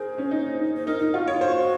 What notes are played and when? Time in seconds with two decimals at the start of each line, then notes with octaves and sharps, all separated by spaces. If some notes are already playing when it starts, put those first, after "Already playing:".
Already playing: G#4 A#4 C5
0.18 C#4
0.31 D#4
0.59 D#4
0.76 C5
0.87 D#4 A#4
0.99 D#4 A#4
1.13 F4 F#4
1.28 F4 C#5
1.41 F#4 C5